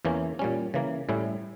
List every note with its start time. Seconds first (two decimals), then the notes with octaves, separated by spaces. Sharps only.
0.05 E2 E3 A#3 C#4
0.39 A#2 G3 C#4
0.74 C#3 E3 A#3
1.09 A2 G3 C#4 E4